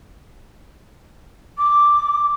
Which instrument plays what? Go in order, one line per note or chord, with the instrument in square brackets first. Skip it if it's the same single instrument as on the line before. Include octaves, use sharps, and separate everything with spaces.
[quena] D6